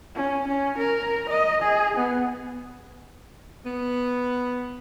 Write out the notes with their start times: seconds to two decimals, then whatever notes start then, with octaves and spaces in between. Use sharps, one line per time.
0.15 C#4
0.48 C#4
0.78 A#4
1.29 D#5
1.62 G#4
1.97 B3
3.65 B3